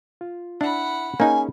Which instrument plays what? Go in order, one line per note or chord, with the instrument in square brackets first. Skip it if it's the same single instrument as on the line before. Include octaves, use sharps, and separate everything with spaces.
[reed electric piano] F4
[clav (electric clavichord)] D4 [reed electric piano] E4 E5 [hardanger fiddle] F#5 B5
[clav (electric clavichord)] A#3 D#4 [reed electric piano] C#4 G#4 [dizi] G#5